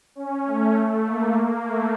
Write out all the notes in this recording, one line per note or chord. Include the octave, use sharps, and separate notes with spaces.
C#4
A3
A3
A#3
A3